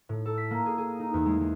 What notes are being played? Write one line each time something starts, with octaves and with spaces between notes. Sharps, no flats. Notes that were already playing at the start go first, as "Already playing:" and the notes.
A2
A4
B6
A#3
G#4
G#4
D#4
E2
G#3
G#3